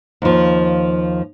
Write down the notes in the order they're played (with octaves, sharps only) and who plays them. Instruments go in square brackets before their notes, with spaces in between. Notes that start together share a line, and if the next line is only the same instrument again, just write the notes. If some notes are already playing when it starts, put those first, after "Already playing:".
[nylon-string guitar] D#2 F3